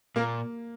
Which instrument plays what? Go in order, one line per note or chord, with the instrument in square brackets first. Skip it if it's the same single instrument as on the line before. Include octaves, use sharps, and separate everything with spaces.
[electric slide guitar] A#2 [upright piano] A#3